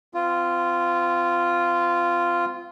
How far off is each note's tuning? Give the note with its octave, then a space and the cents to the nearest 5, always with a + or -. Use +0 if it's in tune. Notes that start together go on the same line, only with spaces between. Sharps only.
C4 -35 F4 -10